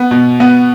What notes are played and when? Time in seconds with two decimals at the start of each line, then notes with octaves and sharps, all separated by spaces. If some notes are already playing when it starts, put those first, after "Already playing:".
Already playing: B3
0.11 B2
0.40 B3